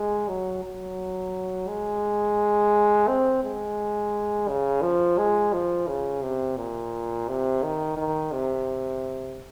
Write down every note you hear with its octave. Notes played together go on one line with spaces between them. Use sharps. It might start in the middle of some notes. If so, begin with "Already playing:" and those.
Already playing: G#3
F#3
F#3
G#3
C4
G#3
C#3
F3
G#3
F3
C#3
C3
A#2
C3
D#3
D#3
C3